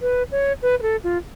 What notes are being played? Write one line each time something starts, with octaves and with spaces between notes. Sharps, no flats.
B4
C#5
B4
B4
A4
F4